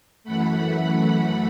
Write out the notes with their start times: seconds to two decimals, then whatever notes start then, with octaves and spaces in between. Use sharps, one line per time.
0.24 F#2 E3 A3 F#5 B5
0.72 F#5 B5